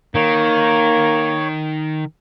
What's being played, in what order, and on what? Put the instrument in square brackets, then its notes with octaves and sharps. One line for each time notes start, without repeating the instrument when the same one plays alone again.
[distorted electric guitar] D#3 [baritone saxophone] A#3 [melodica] C#5